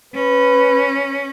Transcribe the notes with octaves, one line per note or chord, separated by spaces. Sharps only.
C#4 B4